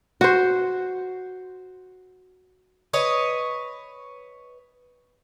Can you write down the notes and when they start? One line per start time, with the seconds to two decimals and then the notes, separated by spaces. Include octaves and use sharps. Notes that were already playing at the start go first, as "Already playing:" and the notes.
0.21 F#4 C5
2.93 B4 C#5 D#5